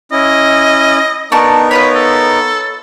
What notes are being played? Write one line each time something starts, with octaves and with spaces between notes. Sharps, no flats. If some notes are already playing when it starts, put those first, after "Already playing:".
C#4 E4 D#5
B3 D4 D#4 A#4 A5 C#6
F4 B4 C#5 B5
A4